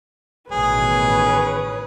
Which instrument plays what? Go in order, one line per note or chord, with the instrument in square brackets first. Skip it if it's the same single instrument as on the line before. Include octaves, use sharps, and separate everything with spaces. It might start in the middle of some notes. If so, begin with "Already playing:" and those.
[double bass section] A1 B2 D#3 [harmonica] G#4 [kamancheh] B4 C#5